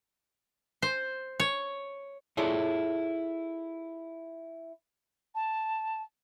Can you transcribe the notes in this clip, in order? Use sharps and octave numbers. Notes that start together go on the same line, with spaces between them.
C5
C#5
E4 F4 G#4 A4 C#5 D5
A5